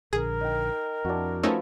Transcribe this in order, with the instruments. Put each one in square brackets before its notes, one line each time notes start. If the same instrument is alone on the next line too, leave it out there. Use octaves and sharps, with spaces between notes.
[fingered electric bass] A#1 D3 [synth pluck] G#4 [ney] A#4
[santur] D#4 G5
[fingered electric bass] F2 [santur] D4 E4 F#4
[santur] F3 B4 D6 [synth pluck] A3 C#4 D#4